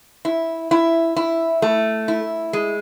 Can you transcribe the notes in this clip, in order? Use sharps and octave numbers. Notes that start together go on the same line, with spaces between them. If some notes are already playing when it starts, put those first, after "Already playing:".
E4
E4
E4
A3
E4
G#3